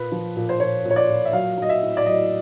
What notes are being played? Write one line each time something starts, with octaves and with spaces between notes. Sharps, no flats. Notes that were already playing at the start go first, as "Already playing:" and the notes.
Already playing: A#2 B4
F3
A#2
C5
A#2 C#5
A#2
C#5
D5
A#2
E5
F#3 F5
F#3 D#5
E5
A2
D5
F#3 D#5